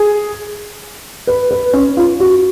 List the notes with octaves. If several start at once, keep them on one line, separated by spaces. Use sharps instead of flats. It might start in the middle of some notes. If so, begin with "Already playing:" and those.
Already playing: G#4
B4
B4
C#4
F4
F#4